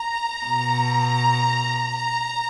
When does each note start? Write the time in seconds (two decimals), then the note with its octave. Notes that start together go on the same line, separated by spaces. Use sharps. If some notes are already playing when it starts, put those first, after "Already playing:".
Already playing: A#5
0.46 B2